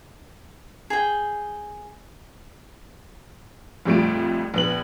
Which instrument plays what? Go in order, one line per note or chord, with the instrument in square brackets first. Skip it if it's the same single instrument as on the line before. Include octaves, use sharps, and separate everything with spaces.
[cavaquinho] G#4 G5
[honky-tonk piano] A#1 F2 G3 A3 F4 D7
A#1 B3 F#7